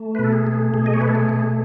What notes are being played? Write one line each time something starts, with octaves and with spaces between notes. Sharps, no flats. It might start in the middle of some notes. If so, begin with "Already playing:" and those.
Already playing: A3
B4
B2 A4
G#4
A3
B2 G#4
D#5
C#5
A3 B4
A4
G#4
B2